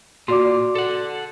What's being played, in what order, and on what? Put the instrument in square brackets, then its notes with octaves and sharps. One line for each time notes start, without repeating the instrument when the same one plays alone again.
[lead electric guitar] A#2 F4 [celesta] F#4 D5 [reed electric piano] C6 D6
[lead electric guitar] A4 F#5